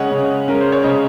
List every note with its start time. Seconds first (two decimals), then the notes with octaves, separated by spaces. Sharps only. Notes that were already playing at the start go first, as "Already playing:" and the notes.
Already playing: C#3 G#3 C#4 C#5 D#5 F#5
0.11 C#3
0.48 G#3 C#4 A#4
0.61 C5
0.72 C#5
0.84 C#3 D#5